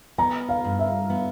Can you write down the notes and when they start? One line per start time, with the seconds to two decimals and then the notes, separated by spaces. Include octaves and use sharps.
0.18 B3 A#5
0.49 F5
0.65 G2
0.79 E5
1.10 B3